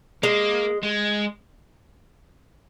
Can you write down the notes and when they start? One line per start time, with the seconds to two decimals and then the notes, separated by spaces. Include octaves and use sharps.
0.23 G#3 A#3
0.83 G#3